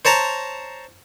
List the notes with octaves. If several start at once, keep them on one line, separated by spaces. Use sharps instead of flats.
C5 C#5 A5 A#5